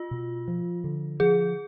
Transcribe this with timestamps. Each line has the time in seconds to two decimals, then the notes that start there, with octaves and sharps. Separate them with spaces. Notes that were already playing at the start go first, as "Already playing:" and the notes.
Already playing: F4
0.11 B2
0.48 F3
0.84 D3
1.20 F3 G#4